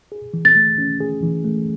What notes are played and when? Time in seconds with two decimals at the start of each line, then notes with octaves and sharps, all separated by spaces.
0.12 G#4
0.34 E3
0.45 A6
0.56 A3
0.78 C#4
1.00 G#4
1.23 E3
1.44 A3